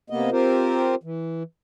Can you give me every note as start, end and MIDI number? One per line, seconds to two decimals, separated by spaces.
0.10 0.30 48
0.10 0.30 58
0.10 0.30 59
0.10 0.30 75
0.32 0.95 60
0.32 0.95 65
0.32 0.95 67
0.32 0.95 70
0.32 0.95 72
1.03 1.43 52